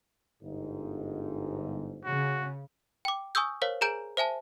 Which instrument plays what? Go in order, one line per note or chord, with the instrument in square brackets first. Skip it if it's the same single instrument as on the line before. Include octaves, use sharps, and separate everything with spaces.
[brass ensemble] G1 G#2 D#4
[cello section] C#3 [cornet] F#4
[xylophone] G5 D6
G#5 C#6 D#6 E6 G6
A#4 C5 C#5 F5
G#4 A#4 G#5 A#5 G6 D7
C5 E5 G#5 A5